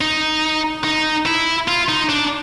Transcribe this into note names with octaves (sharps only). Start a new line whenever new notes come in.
D#4
D#4
E4
F4
D#4
D4